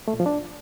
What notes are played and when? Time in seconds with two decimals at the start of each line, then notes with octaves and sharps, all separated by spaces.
0.08 A3
0.14 A#2
0.20 F3
0.26 D4